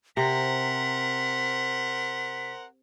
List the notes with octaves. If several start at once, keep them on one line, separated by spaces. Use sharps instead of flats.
C3 A#4 C5 F#5 B6